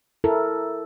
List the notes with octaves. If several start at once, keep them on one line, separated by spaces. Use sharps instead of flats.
E4 A4 A#4